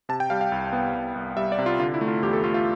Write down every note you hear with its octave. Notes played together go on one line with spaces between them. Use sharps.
C3 A5
G5
G3 F5
F5
C2
B3
C2
C2
G3 E5
D5
C3
F4
D3 F4
E4
A3
F4
E2 G4
A4
A3 F4
F4